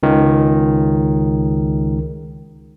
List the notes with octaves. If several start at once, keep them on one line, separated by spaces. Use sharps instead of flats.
C#2 D#3